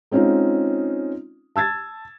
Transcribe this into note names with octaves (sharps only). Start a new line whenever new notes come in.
G#3 C4 C#4 D#4 F4
A5 E6 G#6 A6